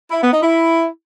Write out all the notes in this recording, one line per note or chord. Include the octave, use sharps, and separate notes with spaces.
E4
B3
D#4
E4